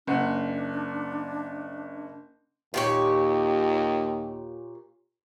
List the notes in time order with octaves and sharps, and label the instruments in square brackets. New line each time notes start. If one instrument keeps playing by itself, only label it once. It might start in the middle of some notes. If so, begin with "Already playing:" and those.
[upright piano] F#1 F#5 [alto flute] D4
[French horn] D#2 [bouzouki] A#2 G4 C#5